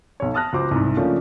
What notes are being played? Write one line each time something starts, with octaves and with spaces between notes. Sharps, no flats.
B1 C#5
A5 D#6 F6 F#6 A#6
C#2 F#3 C5 D6
C2 G#2
C#3 F3 A3 A#3 C#4 D4